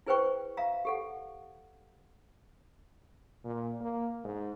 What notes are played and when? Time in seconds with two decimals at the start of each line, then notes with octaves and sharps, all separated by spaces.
0.07 E4 G#4 B4 C5 G5 C#6
0.57 E5 F5 A#5
0.85 G4 A4 F#5
3.44 A#2
3.81 A#3
4.24 G#2